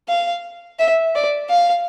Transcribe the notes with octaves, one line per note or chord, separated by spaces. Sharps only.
F5
E5
D5
F5